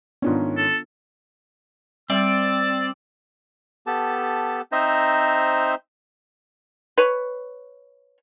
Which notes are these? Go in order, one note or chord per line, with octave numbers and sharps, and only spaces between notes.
G#2 D#3 B3 C#4 D4 F4
A4
G3 C4 D5 E6
B3 G4 A4 A5
C4 D#4 C5 D#5 E5 A#5
B4 C#5